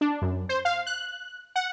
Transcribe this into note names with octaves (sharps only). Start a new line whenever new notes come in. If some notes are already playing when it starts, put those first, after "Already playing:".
D4
F#2
C5
F5
F#6
F#5